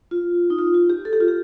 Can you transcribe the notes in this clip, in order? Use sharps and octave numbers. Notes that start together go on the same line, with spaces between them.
F4
D#4
F4
F4
G4
A4
G4
F4
G4